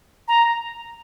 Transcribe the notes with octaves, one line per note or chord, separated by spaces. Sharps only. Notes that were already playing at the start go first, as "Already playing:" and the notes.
A#5